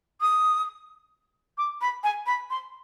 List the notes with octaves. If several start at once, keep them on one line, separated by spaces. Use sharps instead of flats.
D#6
D6
B5
G#5
B5
C6